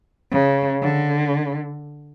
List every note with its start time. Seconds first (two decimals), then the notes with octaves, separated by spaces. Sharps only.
0.31 C#3
0.82 D3